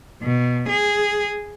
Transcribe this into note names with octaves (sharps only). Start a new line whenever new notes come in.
B2
G#4